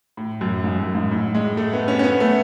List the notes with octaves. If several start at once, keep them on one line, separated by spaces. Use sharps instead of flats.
A2
F#2
G#2
F#2
G#2
A2
G#3
A3
B3
C#4
C#4
B3
A3